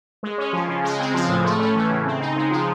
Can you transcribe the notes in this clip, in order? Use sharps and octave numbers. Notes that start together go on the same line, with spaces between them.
G#3
C#4
F3
C#3
G#3
C4
F3
A2
A3
C#4
E3
C#3
C4
D#4
G#3
F3